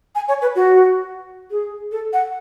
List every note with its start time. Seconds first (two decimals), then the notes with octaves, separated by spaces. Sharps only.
0.15 G#5
0.28 C#5
0.42 B4
0.56 F#4
1.51 G#4
1.92 A4
2.13 F#5